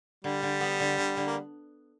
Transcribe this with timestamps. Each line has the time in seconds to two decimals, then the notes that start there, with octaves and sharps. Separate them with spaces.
0.24 D3 G3
0.43 D3
0.61 B3
0.80 D3
0.98 D3
1.17 D3
1.26 A#3